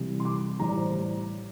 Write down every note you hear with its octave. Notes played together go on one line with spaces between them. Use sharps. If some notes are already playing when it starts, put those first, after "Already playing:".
Already playing: C2 C3 E3 G3
C6
D6
A1 A2 G3 A#5
D5
C5